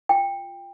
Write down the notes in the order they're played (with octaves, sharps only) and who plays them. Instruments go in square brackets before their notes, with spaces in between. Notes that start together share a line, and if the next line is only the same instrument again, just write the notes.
[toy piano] F4 G5